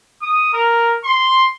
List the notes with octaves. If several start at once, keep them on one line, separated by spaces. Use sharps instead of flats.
D#6
A#4
C6